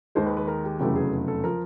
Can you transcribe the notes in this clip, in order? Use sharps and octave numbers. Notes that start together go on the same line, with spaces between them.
D#2 D#3 G#3 C5
B4
B4
A#4
G4
F1 E2 C#3 F#3 A3 G4
G#4
A4
F3 A#4